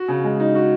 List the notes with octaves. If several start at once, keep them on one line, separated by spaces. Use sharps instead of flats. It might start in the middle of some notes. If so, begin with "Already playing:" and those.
Already playing: F#4
C#3
G#3
D#4
F#4